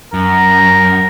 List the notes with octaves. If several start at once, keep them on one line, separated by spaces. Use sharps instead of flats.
F#2 A#4